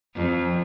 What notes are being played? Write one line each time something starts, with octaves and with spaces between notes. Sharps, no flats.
F2